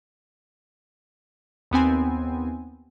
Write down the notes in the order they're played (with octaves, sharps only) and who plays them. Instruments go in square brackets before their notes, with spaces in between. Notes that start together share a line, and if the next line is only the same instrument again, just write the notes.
[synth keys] D#2 B3 C4 G#5